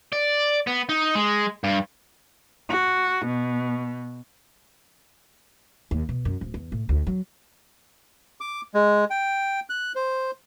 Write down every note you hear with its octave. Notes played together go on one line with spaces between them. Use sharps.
D5
B3
D#4
G#3
G2
F#4
B2
D#2
B2
F#2
D1
E2
A2
D2
F#3
D6
G#3
G5
F#6
C5